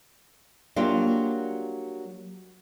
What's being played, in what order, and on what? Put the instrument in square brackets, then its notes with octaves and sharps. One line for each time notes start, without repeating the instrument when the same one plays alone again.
[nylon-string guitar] F#3 G3 A#3 D4 F4